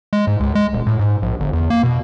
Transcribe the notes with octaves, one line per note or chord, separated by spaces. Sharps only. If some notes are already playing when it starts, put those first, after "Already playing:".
G#3
G#2
C#2
G#3
D#1
A2
G#2
A#1
G1
E2
A#3
B2